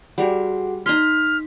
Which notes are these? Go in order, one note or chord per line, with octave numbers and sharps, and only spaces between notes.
G3 F#4 G#4 F#5
D#4 G#5 C6 F6 B6